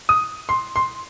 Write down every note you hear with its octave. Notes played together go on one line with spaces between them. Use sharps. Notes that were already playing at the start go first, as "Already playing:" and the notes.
D#6
C6
C6